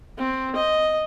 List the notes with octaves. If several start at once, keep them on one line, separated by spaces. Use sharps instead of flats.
C4
D#5